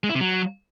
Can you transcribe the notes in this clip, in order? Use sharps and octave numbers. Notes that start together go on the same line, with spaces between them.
G#3
E4
C3
F#3